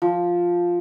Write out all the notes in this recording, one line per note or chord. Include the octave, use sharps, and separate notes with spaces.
F3